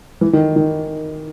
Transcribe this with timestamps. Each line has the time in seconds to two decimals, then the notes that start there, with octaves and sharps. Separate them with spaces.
0.21 E3
0.33 D#3
0.56 D#3